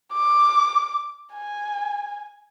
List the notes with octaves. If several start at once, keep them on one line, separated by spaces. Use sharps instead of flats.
D6
G#5